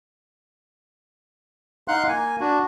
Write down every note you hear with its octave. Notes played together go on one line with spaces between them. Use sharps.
D#4 F5 F#5 C6 F#6
A#3 G#5
D4 F#4